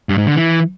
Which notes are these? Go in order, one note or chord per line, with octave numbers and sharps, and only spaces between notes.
G2
G#2
D3
E3